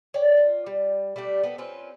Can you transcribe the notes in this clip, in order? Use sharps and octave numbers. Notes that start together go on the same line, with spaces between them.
C#5 D5 G5
F4
G3
G3 A3 D4 G4
B3 C4 A4
C4 C#4 F4 B4